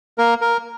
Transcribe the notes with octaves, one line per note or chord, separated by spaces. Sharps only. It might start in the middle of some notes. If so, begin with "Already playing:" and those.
A#3 A#4
A#4